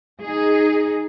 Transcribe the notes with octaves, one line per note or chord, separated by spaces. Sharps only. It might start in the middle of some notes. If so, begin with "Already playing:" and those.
D#4 G#4